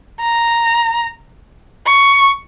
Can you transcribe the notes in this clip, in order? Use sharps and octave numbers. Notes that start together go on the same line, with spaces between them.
A#5
C#6